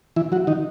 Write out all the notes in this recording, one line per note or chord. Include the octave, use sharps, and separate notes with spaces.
E3 E4
F#3 F#4
D#3 D#4